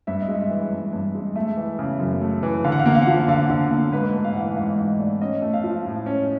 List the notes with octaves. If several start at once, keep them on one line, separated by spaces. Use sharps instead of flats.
G2 E5
D#5
G#3
E5
E3
G2
G2
G#3
A3 E5
E3
C#3
F#2
A3
E3
D3 F5
F#5
F5
A#3 F#5
F5
F#5
F3 F5
D3 F5
D3
A#3
G#2 B4
A3
F5
F#5
E3 F5
G#2 F5
G#2 D#5
A3 D5
C#4 D#5
A3
F5
F3
A2
C#4